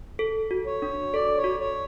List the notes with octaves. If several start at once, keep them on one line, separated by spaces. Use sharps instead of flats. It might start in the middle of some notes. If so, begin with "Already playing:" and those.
A4
F#4
C#5
D4
A4 D5
C#5
F#4
C#5